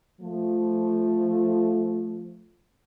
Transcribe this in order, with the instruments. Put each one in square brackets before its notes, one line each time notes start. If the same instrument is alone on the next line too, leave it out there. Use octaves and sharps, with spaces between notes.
[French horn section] F3 A3